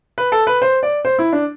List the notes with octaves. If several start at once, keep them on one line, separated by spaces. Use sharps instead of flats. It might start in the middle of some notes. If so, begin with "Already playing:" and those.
B4
A4
B4
C5
D5
C5
E4
D4